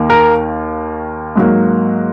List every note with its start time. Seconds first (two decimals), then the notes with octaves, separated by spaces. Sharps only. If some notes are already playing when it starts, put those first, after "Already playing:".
Already playing: D#2 D#3 A#3
0.10 A#4
1.36 G#2 F#3 A#3